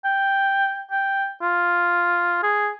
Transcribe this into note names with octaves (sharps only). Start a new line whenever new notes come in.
G5
G5
F4
G#4